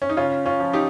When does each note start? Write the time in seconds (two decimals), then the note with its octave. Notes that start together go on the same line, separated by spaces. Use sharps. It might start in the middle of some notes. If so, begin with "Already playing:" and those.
0.02 C#4
0.09 D#4
0.17 C#3 C#4 F4
0.46 C#4 F4
0.60 F3
0.73 D#4 G4